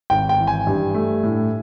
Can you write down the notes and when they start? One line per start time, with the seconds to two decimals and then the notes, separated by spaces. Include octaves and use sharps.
0.10 G#1 G5
0.29 G5
0.38 E3
0.47 G#5
0.67 G2
0.94 A3
1.23 A2